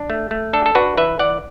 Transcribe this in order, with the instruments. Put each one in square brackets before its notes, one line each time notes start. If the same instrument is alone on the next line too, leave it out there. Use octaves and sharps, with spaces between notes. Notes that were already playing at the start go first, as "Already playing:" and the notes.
Already playing: [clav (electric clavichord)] D4
A3
A3
D4 A4
A4
D4 F#4 B4
E3 B4 E5
E3 D5 F#5